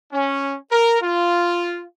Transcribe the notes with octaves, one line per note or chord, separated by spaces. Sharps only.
C#4
A#4
F4